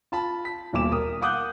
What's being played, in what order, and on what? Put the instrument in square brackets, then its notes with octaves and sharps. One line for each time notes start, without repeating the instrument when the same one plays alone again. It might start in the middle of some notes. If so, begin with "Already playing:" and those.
[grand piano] F4 A5 B5
B6
D#1 B1 A#2 D6 E7
A#4 D#6
F5 F#5 D6 D#6 F#6 G6